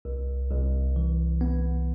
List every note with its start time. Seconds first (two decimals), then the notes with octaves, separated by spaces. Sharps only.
0.05 C2
0.50 C2
0.96 E3
1.41 B3